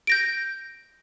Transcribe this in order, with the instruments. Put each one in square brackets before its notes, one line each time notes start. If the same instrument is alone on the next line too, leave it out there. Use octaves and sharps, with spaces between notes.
[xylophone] G6 A#6 D7